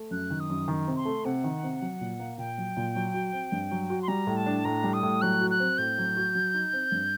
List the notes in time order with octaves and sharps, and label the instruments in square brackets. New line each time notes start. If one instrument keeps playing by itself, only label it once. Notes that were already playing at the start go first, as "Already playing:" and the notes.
Already playing: [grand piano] A3
[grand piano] F#2 [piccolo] F#6
[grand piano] D#3
[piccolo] D#6
[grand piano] F#2
D#3
C3
[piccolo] C6
[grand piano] A3
[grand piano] C3 [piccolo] F#5
[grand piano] D#3
C3
F#3
A#2
A#3
[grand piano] A#2 [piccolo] G5
[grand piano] F#3
A#2
F#3
F#4
C4
G2
F#3
F#4
[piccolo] C6
[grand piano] G3 [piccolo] A#5
[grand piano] A2
[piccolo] A5
[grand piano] D4
[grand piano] A2 [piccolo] A#5
[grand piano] G3
[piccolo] D#6
[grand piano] A2
[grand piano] F#3 [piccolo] F#6
[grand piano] F#4
[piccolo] F#6
[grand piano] C4
[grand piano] A2 [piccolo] G6
[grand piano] F#3
F#4
F#3
D#4
C4
G2